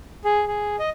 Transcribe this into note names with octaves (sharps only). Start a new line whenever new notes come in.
G#4
G#4
D#5